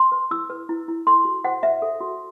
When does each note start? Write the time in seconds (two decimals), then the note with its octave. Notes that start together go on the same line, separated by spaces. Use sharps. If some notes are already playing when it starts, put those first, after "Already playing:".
Already playing: C6
0.12 B4
0.31 E4 E6
0.50 B4
0.69 E4
0.88 E4
1.07 A4 C6
1.25 F#4
1.44 C5 F#5
1.63 C5 E5
1.82 A4
2.00 F#4